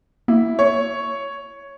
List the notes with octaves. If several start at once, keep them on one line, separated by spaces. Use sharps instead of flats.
A#3 E4
C#5